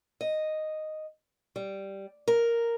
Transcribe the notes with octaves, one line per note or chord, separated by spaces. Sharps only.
D#5
G3
A#4